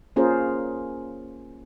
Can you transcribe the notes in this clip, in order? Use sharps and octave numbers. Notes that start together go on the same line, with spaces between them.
A#3 C#4 F4 G#4 A#4 C5